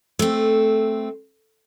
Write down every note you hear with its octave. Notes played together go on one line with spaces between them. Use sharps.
A3 C4